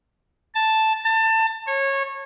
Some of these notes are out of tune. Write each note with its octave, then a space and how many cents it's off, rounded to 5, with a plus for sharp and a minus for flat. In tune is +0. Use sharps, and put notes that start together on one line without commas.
A5 +0
A5 +25
C#5 -20